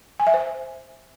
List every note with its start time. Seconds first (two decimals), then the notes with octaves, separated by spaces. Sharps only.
0.20 G#5
0.27 E5
0.34 C5